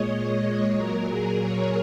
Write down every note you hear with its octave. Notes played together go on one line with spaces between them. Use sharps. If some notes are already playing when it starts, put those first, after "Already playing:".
Already playing: A#2 G#3 C#5 D#5
A#2 F#3 A#4
G#4
C#5